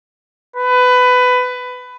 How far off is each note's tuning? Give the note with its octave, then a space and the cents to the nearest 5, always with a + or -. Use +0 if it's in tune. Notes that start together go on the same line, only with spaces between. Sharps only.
B4 +20